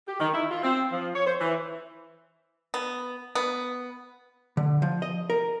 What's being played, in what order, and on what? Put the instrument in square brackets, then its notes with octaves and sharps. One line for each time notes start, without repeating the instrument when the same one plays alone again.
[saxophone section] G4
D#3
E4
F4
C4
F3
C#5
C5
E3
[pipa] B3
B3
[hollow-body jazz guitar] D3
F3
D#5
A#4